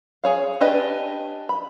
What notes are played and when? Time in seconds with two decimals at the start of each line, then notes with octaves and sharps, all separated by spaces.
0.24 G#4 C#5 F5
0.61 D4 G4 B4 D#5 G#5
1.49 B5